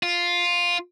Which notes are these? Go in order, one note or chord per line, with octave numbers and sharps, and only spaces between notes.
F4